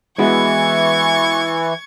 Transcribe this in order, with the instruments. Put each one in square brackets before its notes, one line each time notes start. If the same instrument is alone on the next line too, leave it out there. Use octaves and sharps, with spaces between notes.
[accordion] E3 [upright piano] G#3 B3 F#4 [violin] C#6 G#6